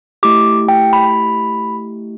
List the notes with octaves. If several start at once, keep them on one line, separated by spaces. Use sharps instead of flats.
A3 E4 G4 D6
G5
B5